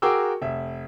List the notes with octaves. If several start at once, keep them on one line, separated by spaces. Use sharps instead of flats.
F#4 G#4 A#4 G5 D6 E6
F1 E5